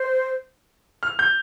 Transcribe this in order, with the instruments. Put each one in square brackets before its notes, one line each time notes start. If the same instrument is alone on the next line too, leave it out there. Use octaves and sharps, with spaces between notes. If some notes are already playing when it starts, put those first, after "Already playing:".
Already playing: [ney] C5
[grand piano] F6
G6